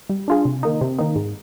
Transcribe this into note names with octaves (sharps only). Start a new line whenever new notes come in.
G3
D4 F4 G#4
C3
D#3 A#3 D#4
C3
D#3 A#3 D#4
G#2